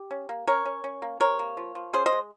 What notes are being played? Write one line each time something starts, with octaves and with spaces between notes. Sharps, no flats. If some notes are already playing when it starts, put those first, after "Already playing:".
Already playing: G4
C#4
A#3
C#4 A#4 C#5
C#4
C#4
A#3
C3 A#4 C#5
A#3
F3
F3
C#4 G#4 C5
C5 D#5
G#3